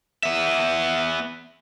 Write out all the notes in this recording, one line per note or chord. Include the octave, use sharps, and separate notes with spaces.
B3 E5